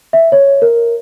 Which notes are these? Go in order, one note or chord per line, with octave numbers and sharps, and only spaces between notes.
E5
C#5
A#4